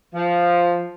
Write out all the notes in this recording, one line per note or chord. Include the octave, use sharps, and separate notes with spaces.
F3